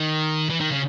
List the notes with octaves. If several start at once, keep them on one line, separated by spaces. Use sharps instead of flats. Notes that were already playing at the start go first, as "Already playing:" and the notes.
Already playing: D#3
E3
D#3
C#3